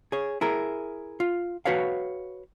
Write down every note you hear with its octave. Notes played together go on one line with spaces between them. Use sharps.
G#4 C#5
E4 G#4 A#4
F4
F#4 B4 C#5 F5